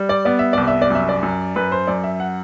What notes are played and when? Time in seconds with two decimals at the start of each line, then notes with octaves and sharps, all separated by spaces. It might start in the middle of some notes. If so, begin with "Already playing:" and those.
Already playing: G3
0.09 D5
0.25 B3 D5
0.39 E5
0.53 C2 D5
0.68 E5
0.82 D5
0.90 F#2 E5
1.09 D5
1.23 F#2
1.56 F#2 B4
1.72 C5
1.87 F#2 D5
2.04 E5
2.20 F#5